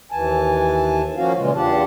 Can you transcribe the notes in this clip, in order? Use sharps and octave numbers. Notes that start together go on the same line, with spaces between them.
D#2 E3 G#5 A5
F3 A#3 C#4 F#4 F5
A#2 C#3 E3 G#3 F4
E2 D4 F4 G4 F#5 A5